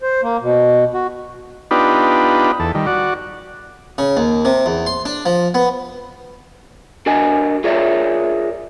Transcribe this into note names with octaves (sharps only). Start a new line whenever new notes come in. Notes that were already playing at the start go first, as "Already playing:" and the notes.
C5
A#3
B2
F#4
B3 D4 D#4 F4 G4 B4
E2 A4
D#3 G3
F#4 D5
C#3
D#2
C3
E2
C6
D4
F3
B3
D4 F#4 A#4 D#5 G#5
F4 G#4 A#4 C#5 D5 E5